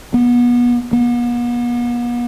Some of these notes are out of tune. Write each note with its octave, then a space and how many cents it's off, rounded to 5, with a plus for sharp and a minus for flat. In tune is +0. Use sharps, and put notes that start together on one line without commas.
B3 -30
B3 -45